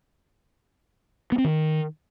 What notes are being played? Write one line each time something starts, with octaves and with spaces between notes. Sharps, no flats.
B3
C4
D#3